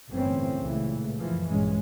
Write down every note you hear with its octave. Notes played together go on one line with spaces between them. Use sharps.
G1 A2 E3 C4 C#4
C#2 A#2 E3 A3
F#2 E3 F3
A#1 G2 G#3 C#4